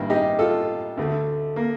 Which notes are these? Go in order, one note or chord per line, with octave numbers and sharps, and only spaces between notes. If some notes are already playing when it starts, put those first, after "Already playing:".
Already playing: A1 G2 D#3 G3 A#3
D#4 G4
F4 A4
D2 D3 A3
A#3